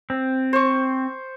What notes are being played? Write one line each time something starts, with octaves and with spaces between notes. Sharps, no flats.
C4
C5 C#6